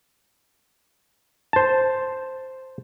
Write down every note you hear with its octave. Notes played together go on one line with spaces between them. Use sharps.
C5 A5